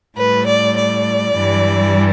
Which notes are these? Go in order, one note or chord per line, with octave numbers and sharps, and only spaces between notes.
A2 G3 B4
D5
D5
G2 E3 G3